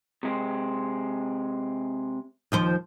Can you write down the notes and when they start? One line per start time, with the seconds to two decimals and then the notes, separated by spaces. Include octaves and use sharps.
0.23 C3 G#3 C4
2.52 D#2 F3 C5